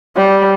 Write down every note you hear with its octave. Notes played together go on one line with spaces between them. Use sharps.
G3